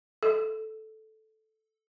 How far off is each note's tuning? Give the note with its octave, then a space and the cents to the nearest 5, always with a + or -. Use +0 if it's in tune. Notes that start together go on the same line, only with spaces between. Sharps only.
A4 -5